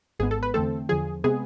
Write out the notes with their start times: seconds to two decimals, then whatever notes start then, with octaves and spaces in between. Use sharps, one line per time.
0.19 G#1 G#2 G#3 B3 G#4
0.31 A4
0.43 B4
0.54 E2 D3 A3 C4 A4
0.89 E2 D3 F3 G#4
1.24 C3 G#3 B3 G#4